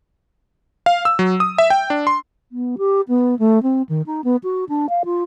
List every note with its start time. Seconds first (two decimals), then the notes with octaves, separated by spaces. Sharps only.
0.86 F5
1.05 E6
1.19 F#3
1.40 D#6
1.58 E5
1.70 G5
1.90 D4
2.07 C6
2.52 B3
2.78 G4
3.08 B3
3.39 A3
3.63 C4
3.89 D#3
4.06 D#4
4.24 B3
4.43 F#4
4.69 D4
4.89 F5
5.05 F4